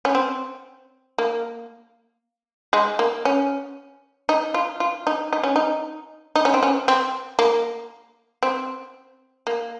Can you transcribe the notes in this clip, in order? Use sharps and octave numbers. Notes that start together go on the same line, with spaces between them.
C#4
C4
A#3
G#3
A#3
C#4
D#4
F4
F4
D#4
D#4
C#4
D#4
D#4
C#4
C4
C#4
C4
A#3
C4
A#3